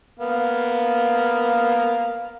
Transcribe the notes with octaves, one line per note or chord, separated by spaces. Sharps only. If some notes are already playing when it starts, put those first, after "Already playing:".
A#3 B3 F5